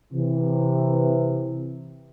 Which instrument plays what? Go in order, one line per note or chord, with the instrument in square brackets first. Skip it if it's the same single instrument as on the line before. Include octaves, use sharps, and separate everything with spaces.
[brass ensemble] C3 E3